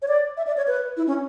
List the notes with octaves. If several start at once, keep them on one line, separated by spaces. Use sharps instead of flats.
C#5
D5
E5
D5
C#5
B4
E4
C#4